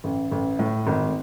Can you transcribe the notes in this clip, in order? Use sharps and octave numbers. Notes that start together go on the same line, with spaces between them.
A1
A1
A2
G#1